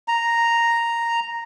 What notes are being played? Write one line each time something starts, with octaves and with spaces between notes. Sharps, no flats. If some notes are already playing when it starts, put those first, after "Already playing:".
A#5